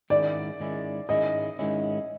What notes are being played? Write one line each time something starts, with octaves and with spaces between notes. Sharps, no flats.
G#2 D#3 G#3 C#4 E4 D5
G#2 D#3 G#3 C#4 E4
G#2 D#3 G#3 C#4 E4 D#5
G#2 D#3 G#3 C#4 E4